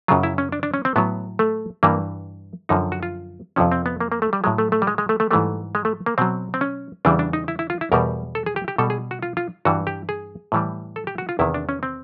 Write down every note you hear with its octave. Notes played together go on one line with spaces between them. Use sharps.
F#2 C#3 F#3 F4
E4
C#4
D4
D4
C#4
C4
A2 F#3 B3
A3
G2 E3 G3 A#3
F#2 D3 F3 D#4
F#4
F4
F2 C3 F3 C#4
C4
B3
A#3
A#3
A3
G3
A2 F#3 G#3
A3
A3
G3
G#3
G#3
A3
A3
G#2 E3 G3 A3
G#3
A3
A#3
B2 F#3 C4
C4
C#4
E2 C#3 E3 G3 D4
D4
D#4
E4
E4
F4
E4
E2 B2 G3 A#4
A4
G#4
G4
G4
B2 G3 A4
G#4
F#4
F4
F4
G2 E3 G3 F#4
G4
G#4
A2 E3 G3
A4
G4
F#4
F4
E2 C3 D#3 E4
D4
C#4
C4